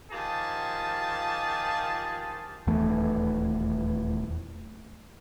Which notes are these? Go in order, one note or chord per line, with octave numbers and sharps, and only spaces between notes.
D#3 F3 F4 G4 G#4 A5
D#1 E2 E3 A3